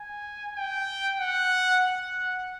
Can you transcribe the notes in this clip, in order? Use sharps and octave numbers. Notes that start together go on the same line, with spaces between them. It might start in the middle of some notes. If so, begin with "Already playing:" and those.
Already playing: G#5
G5
F#5
F#5